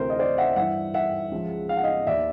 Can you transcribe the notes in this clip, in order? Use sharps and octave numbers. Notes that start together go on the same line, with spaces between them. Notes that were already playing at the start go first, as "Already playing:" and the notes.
Already playing: D2 C3 E3 A#4 C5
D#5
C5 D5
E5 F#5
G2 E3 E5 F#5
E5 F#5
C#2 C#3 F3
F5
F#5
D#5 F5
D#2 D#3 D5 E5